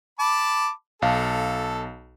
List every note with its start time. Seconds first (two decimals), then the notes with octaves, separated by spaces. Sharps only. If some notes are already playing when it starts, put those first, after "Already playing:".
0.19 A5 B5 D6
1.02 B1 A4 F5 A5